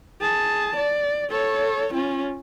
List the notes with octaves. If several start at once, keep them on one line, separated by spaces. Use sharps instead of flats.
G#4 A5
D5
A4 C#5
C#4 F4